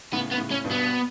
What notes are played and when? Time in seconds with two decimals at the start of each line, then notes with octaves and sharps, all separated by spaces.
0.13 A2 C#3 B3
0.31 B3
0.38 A2 C#3
0.51 C#4
0.64 G2 B2
0.71 B3